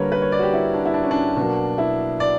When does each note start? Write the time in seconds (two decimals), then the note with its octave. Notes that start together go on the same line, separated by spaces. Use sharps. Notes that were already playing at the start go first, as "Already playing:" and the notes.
Already playing: D3 G3 A#3 A#4 B4 C#5
0.12 B4
0.22 C#5
0.32 D5
0.39 F#4
0.43 G4
0.54 E4
0.74 D4
0.86 E4
0.94 D4
1.03 C#4
1.11 D4
1.36 B2 F#3 A#3
1.78 E4
2.20 D5